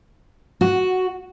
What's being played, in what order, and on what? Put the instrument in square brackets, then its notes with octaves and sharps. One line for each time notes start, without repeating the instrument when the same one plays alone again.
[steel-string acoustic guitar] F#4